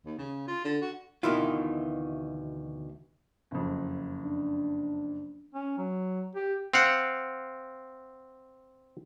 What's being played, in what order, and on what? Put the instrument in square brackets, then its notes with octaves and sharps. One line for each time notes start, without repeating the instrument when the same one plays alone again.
[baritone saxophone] D#2
C#3
F4
D3
F#4
[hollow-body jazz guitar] D2 B2 D#3 E3 E4 F4
[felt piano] F#1 F2
[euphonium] D4
[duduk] C#4
F#3
G4
[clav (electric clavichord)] C4 F5 F#5